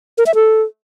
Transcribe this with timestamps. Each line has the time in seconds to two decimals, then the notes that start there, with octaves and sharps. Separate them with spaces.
0.18 A#4
0.26 E5
0.35 A4